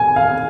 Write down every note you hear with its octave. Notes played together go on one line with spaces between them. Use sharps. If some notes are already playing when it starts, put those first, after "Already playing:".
Already playing: G#5
F5